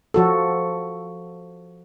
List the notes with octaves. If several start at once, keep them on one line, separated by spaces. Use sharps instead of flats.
F3 F#4 A4